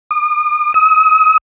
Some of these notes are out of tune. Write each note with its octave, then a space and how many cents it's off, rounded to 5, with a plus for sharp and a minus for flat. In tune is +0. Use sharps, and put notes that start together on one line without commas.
D#6 -45
D#6 +35